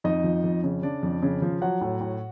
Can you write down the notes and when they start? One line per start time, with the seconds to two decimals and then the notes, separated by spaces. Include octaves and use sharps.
0.04 F2 D#4 D#5
0.24 F3
0.44 F2
0.64 C#3
0.83 C#3 D4 D5
1.03 F2
1.23 C#3
1.42 F3
1.62 F#3 F#4 F#5
1.81 A2
2.01 A2